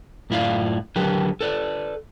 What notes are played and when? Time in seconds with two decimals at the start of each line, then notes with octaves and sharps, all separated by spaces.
0.30 F#2 A2 E4 F4 D5 F5
0.96 D3 F#3 G4 A#4 B4
1.41 A4 B4 D5